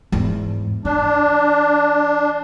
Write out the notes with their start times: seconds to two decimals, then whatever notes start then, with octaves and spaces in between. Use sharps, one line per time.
0.12 E2 G#2
0.85 E3 D4